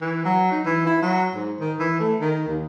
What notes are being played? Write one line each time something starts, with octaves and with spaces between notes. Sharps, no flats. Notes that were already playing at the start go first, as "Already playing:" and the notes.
E3
F#3
D#4
E3
E4
F#3
G#2
D#3
E3
A3
D#3
D#2